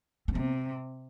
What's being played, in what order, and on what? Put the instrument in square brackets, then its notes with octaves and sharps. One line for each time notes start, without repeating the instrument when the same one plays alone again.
[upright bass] C4
[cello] C3 [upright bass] B3